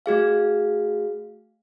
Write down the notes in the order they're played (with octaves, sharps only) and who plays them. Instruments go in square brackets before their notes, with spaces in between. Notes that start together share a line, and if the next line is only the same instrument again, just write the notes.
[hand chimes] A3 F#4 G#4 F5